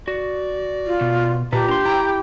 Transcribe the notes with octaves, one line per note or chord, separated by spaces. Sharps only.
F#4 D5
F4
B2
A#2 G4 B4 A5 A#5
D4 A#5 C6
E4 G5 A#5